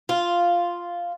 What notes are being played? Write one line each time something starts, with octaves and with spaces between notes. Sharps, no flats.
F4